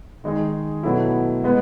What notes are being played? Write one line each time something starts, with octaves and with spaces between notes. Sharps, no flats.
D#3 G#3 D#4 G#4
B2 F#3 A3 E4
G#3 B3